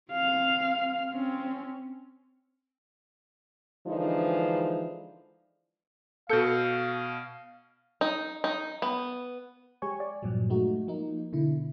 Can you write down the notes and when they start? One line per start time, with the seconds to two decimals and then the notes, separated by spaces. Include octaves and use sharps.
0.12 C4 F5
1.13 C4 C#4
3.87 D3 E3 F3 G#3 D4 D#4
6.29 B2 A4 F5 G6 C#7
8.01 D#4
8.44 D#4
8.82 B3
9.82 G#3 G4 C#5 G#5 C#6
10.00 D5
10.23 G2 A#2 F3 F#3
10.50 G#3 A3 D#4 F#4
10.87 F3 A#3 D#4
11.33 B2 D3 E4